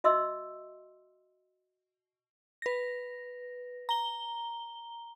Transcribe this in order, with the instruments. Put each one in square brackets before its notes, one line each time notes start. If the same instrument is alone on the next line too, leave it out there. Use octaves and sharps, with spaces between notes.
[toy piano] F#4 D#5 E5 C6 E6
[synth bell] B4 A#6
A#5 G7